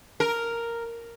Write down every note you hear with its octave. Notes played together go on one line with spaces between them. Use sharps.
A#4